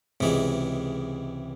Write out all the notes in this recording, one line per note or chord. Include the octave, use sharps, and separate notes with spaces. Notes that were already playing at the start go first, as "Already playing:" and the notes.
C#2 C3 E3 G#3